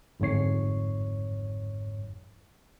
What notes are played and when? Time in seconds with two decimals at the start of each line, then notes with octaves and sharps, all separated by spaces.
0.20 G1 F2 G#2 C#5 C7